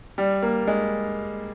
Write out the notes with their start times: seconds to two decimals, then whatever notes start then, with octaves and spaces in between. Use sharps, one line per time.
0.18 G3
0.42 A#3
0.67 G#3